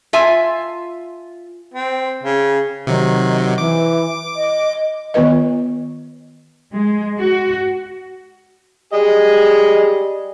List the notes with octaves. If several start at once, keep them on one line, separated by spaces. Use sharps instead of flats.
F4 E5 G#5
C4
C#3
C3 D#3 F#3
E3 D6
D#5
D#3 B3 F4 B4 D#5
G#3
F#4
G3 G#4 D#5